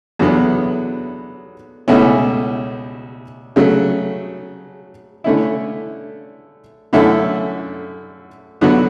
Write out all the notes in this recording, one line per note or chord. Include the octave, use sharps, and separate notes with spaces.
E2 D3 F#3 B3
C#2 B2 A3 C#4 E4
C#3 F#3 A3
D3 A3 C#4 E4
F#2 D3 A3 E4 A4
D3 F#3 B3 F#4